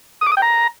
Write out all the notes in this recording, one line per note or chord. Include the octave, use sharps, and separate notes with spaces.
D#6
D6
D#6
G5
A#5